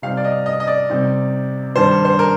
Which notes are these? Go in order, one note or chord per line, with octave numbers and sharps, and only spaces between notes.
C3 G3 C4 D#4 F5
D5
D#5
D#5
D#5
D5
C3 G3 C4 D#4
G2 D#3 G3 D4 C5
C5
A#4